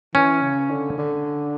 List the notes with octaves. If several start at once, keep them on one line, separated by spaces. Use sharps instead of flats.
E3 C#4
C#3
D3
D3